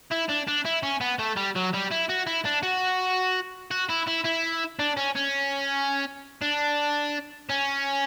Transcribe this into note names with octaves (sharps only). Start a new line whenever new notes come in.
E4
D4
D4
E4
C#4
B3
A3
G3
F#3
G3
E4
F#4
E4
D4
F#4
F#4
E4
E4
E4
D4
C#4
C#4
D4
C#4